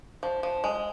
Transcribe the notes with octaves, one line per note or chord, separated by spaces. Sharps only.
F3
F3
G#3